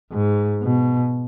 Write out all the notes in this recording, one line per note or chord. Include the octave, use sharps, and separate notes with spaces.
G#2
B2